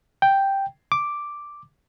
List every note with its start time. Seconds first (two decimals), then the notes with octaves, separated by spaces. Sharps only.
0.22 G5
0.92 D6